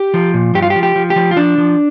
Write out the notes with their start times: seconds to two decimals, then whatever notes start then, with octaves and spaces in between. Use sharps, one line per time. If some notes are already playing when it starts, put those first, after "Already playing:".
Already playing: G4
0.14 F3
0.34 A#2
0.54 G2 G4
0.62 F4
0.70 G4
0.76 F3
0.83 G4
0.96 F3
1.10 G4
1.16 F3
1.31 F4
1.36 F3 D4
1.58 F3